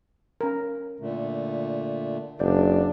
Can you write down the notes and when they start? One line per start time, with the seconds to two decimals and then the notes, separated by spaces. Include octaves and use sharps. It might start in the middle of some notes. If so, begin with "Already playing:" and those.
0.41 C#4 A#4
1.00 A#2 D3 A3
2.40 F#1 D4 D5